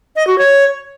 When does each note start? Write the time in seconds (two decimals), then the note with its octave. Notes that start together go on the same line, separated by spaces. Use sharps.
0.16 D#5
0.27 F#4
0.38 C#5